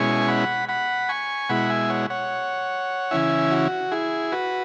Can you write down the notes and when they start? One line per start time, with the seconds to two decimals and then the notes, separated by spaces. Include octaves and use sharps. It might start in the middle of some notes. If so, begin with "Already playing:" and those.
Already playing: B2 G#3 C#4 E4 G#5 C#6
0.28 F#5 B5
0.69 F#5 B5
1.09 G#5 C#6
1.49 B2 G#3 E4 F#5 B5
1.70 E5 G#5
1.90 C#5 F#5
2.10 C#5 F#5
3.11 C#3 E3 C#4 E4 E5 G#5
3.51 F#4
3.92 E4 G#4
4.32 F#4 B4